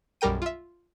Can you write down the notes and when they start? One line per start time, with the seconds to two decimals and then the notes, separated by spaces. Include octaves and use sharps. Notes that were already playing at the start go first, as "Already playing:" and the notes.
0.21 B1 F#2 G3 A#4 G5 D#7
0.42 F4 E5